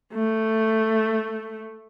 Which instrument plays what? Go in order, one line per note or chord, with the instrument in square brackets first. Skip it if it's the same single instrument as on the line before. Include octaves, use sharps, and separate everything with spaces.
[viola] A3